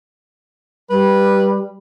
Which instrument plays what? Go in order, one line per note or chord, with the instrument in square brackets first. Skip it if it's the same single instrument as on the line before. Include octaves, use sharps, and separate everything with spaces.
[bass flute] G3 [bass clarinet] B4